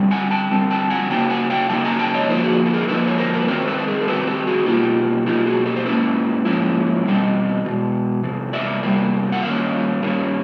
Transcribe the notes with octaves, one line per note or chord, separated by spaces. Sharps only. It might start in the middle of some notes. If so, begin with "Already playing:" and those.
Already playing: D3 G3 C4
F#5 G#5
G5 A5
D3 G3 C4
G5 A5
F#5 G#5
C#3 F#3 A#3 D#4 G5 A5
F#5 G#5
F5 G5
C#3 F#3 A#3 D#4 G5 A5
G#5 A#5
G5 A5
C#5 D#5
D3 F3 A#3 D#4 C5 D5
F#4 G#4
A4
G#4 A#4
D3 F3 A#3 D#4 A4 B4
C#5
A#4 C5
A#4
B4
D#3 F#3 A3 C4 A#4 C5
A4 B4
B4
G#4 A#4
A#4
D#3 F#3 A3 C4 A4 B4
G4 A4
F#4 G#4
B2 F#3 A#3 D#4 F4 G4
B2 F#3 A#3 D#4 F4 G4
F#4 G#4
G4 A4
C5
G#2 F3 A#3 C#4 E4 A4 B4
G#2 F3 A#3 C#4 E4
E2 B2 G3 C4 D#4
E2 B2
E2 C3
D5 E5
E2 C3 G3 A#3
F#5
G2 D#3 A#3 C#4 F5
G2 D#3 G3 A#3 C#4